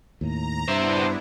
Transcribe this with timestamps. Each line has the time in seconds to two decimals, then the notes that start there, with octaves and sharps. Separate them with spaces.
0.21 D#2 A2 A#5
0.68 G2 B3 D4 E4 C5 E5